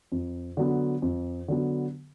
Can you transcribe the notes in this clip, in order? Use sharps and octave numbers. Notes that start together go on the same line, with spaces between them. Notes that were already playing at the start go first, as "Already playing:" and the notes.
F2
D3 F#3 B3
F2
D3 F#3 B3